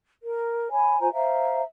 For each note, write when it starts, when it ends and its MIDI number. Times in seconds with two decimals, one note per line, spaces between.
0.23 0.67 70
0.71 0.99 73
0.71 0.99 80
0.71 0.99 83
1.00 1.12 65
1.00 1.12 72
1.00 1.12 80
1.00 1.12 82
1.13 1.62 72
1.13 1.62 76
1.13 1.62 77
1.13 1.62 82